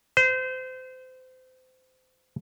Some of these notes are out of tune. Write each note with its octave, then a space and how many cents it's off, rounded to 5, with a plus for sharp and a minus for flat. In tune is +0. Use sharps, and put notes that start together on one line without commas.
C5 -30